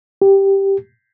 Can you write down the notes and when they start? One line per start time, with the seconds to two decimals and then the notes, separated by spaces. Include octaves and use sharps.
0.22 G4